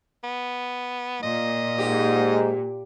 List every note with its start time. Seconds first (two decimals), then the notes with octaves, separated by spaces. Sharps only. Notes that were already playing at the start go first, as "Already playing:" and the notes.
0.23 B3
1.23 A#2 D#5
1.78 G#2 G4